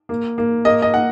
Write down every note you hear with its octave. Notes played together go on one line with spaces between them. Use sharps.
A#3
A#3
A#3 D#5
D#5
A#3 F#5